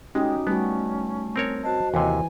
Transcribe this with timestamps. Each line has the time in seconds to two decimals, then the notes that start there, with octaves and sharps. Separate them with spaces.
0.15 G#3 C#4 D#4 F#4 G4 D#6
0.47 G3 A3 B3 C#4 F#4
1.36 C4 A#4 C#5
1.64 F#4 C5 D#5 A5
1.94 D#2 C3 E3 G#5